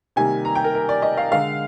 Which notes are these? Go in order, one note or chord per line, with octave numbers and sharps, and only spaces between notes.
C3 D#3 G3 A#3 G#5
A#5
G5
A#4
A#4
D5
D#5
F5
D3 G#3 F5